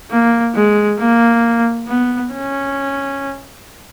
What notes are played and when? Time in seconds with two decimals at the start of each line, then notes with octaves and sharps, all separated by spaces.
0.11 A#3
0.55 G#3
0.99 A#3
1.88 B3
2.33 C#4